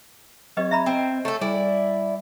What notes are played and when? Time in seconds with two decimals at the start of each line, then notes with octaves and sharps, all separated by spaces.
0.57 F#3 C4 G4 B4 D#5 G#6
0.71 E5 A#5 B5
0.86 C4 D#5 G5
1.25 A3 A4 C#5
1.41 G3 E4 D5